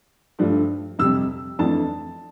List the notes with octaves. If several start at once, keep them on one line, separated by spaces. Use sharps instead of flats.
G2 F3 A3 D4
F2 C3 G3 E6
F2 E3 A3 D4 A5